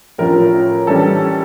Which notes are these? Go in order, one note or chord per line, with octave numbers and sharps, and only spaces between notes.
A2 F3 C#4 A#4
E3 G3 C#4 A4